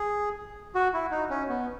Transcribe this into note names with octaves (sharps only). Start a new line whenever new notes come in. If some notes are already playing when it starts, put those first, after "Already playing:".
Already playing: G#4
F#4
E4
D#4
C#4
B3